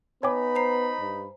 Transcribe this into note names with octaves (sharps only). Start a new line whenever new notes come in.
B3 D#4 C#5 G5 G#5 B5 D6
C5 A#5 C7
G2